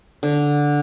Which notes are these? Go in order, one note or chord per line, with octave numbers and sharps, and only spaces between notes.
D3